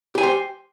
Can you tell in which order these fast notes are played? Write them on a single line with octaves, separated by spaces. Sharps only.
G4 G#5 G5 C5